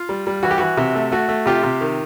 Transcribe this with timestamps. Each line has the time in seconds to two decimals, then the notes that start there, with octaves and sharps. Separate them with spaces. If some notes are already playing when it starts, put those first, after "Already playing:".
Already playing: F4
0.09 G3
0.27 G3
0.43 E3 F#4
0.51 G4
0.58 E3 F#4
0.77 C3
0.95 A3
1.12 A3 F#4
1.29 A3
1.46 C3 F4 G4
1.63 C3
1.81 D#3